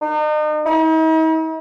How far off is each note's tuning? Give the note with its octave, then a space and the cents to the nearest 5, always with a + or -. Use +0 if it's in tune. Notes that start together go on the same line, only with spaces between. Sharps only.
D#4 -40
D#4 +45